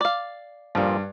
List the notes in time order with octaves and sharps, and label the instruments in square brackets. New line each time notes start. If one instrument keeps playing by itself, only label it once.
[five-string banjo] D5 F5
[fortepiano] G2 [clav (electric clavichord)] A#2 F3